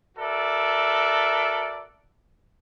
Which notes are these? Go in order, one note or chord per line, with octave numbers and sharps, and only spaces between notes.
F#4 A4 A#4 D5 E5